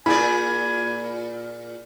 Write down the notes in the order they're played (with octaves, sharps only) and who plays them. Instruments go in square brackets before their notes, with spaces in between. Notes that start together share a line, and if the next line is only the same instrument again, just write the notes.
[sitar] A#2 G#4 D5 [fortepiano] E4 [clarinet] G#5 [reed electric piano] B5